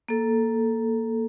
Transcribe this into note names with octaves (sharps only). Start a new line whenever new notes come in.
A#3 A4